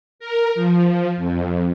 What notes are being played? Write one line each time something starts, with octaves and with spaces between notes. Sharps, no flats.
A#4
F3
F2